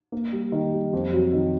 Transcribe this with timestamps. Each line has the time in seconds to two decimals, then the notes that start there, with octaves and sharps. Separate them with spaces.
0.12 A#3
0.32 G3
0.52 D#3
0.73 G3
0.93 F2
1.13 F#3
1.33 D#3